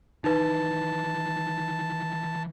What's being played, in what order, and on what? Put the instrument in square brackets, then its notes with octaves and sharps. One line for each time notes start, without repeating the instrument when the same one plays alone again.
[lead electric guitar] D#3 E3 [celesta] D#4 B4 [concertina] A5